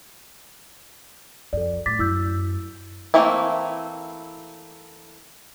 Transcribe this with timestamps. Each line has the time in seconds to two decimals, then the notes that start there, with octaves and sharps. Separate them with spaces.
1.53 F2 A4 D5
1.86 A2 D6 A6 B6
1.99 F#2 E4 E6 G6
3.14 E3 A3 A#3 C4 E4